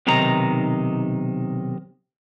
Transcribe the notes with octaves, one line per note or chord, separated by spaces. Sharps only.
B1 C3 D#3 D#4 A#5